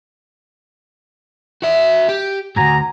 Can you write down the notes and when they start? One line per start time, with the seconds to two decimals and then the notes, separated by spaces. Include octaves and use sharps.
1.62 F#4 E5
2.09 G4
2.56 D2 G#2 F#4 G#5 A#5